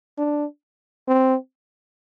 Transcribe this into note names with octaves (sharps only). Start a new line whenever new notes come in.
D4
C4